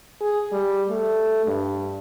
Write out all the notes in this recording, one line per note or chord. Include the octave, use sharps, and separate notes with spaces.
G#4
G3
A3
G2